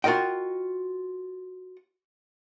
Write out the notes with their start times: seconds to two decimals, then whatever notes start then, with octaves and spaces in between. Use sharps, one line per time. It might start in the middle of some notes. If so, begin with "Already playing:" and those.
0.04 F4 F#4 A#4 D#5 G5